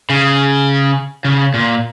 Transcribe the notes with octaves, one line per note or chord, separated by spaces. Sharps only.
C#3
C#3
A#2